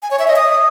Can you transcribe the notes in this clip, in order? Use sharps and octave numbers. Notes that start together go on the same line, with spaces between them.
G#5
C#5
E5
D#5
D#6